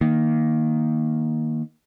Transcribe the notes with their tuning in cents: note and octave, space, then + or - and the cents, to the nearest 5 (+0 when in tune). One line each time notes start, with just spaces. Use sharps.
D#3 +0 A#3 +0